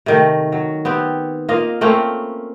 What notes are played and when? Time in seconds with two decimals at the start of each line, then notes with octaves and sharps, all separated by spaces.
0.06 C3 D#3 A3
0.52 F#3
0.85 B3 C4 G4
1.49 A#3 F4 D#5 F5
1.81 A3 A#3 C4 C#4